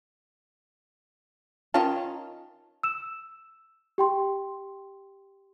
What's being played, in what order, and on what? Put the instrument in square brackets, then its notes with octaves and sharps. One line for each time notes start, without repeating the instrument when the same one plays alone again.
[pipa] D#3 A5 [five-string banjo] C#4 F4
[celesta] E6 E7
G4 G5 C6